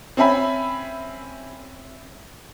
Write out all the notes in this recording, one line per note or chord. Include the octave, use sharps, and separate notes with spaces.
C4 C#4 E5 G#5 B5